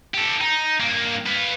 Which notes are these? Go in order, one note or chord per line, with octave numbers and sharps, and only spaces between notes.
G4 A4
D#4
G2 A#3
B4 F5